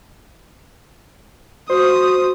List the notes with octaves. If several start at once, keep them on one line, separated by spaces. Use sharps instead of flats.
F#4 C5 D#6